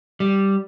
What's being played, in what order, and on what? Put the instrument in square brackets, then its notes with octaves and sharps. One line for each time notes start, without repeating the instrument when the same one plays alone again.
[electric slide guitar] G3